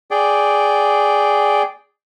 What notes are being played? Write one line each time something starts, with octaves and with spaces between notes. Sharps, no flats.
G#4 D5 G5